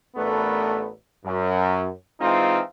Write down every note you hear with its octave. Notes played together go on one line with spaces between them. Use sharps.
A1 A3 B3 D4 A#4 B4
F#2
E3 G#3 C4 D#4 F4